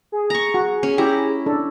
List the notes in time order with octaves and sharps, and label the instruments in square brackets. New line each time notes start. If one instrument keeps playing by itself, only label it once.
[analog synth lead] G#4
[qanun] A#5 C#6
[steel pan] F#4
[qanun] C#4
[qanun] E4 A#5 [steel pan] G4
[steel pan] D4 A4